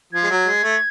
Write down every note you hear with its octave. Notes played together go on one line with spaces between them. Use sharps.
F3 G#6
G#3
F#3
G#3
A3